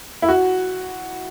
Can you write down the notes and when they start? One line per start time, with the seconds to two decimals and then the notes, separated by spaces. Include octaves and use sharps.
0.22 E4
0.28 F#4